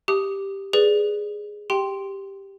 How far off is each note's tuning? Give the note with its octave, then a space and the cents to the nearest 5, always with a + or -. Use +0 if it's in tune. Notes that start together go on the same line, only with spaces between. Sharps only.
G4 +0 D#6 +0
G#4 +0 B4 +0 D5 +0
G4 +0 G5 +0 C6 +0